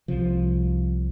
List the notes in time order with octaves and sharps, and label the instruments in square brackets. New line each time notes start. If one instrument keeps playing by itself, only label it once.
[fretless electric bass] C2 C3 F3